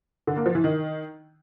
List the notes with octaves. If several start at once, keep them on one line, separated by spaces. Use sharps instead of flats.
D3
A#3
F3
E3
D#3